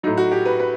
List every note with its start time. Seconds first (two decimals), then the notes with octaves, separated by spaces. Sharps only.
0.03 A2 F#3 D#4
0.17 F#4
0.31 G4
0.45 B4
0.59 B4